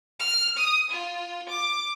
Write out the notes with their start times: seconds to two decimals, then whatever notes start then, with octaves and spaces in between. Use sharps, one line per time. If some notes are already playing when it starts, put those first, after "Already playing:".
0.19 F6
0.57 D#6
0.90 F4
1.49 D6